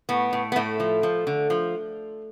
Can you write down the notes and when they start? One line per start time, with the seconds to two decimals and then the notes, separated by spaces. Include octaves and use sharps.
0.09 A2 B3
0.33 A2
0.52 B3
0.56 A2 A3
0.80 F3
1.03 F3
1.27 D3
1.50 F3